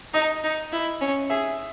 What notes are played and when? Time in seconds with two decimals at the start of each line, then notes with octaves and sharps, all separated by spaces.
0.14 D#4 D#5
0.44 D#4
0.72 E4
1.01 C#4
1.29 G#4 E5